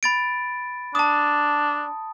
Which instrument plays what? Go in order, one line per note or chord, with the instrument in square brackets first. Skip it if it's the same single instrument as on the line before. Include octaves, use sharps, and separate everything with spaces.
[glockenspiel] B5 A6 D7
[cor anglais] D4 [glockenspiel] A5 D#6